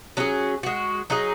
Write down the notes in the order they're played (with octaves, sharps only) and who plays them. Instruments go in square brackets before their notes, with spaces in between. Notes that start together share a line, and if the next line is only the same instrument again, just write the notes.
[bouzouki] F#3 C#4 G#4
G#3 F#4
F#3 D#4 G#4